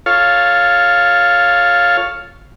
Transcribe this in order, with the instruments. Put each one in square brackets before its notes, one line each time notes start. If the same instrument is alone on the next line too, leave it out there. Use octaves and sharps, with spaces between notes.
[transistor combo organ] F4 A4 C#5 F5